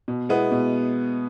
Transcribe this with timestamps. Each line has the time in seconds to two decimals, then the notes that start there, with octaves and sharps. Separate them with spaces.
0.08 B2
0.29 G#3 B3 E4
0.51 B2